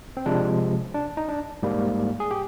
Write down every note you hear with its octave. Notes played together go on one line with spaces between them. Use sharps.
C4
C3 F3 G#3 D4
D4
D#4
D4
G#2 G3 A#3
G#4
G4